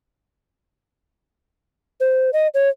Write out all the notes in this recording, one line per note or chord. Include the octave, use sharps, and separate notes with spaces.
C5
D#5
C#5